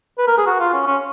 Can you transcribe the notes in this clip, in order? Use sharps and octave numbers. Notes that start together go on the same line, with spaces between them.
B4
A#4
G#4
F#4
F4
C#4
C#4